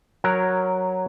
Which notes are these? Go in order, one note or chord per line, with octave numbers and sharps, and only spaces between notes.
F#3 A#4 C#5 F#5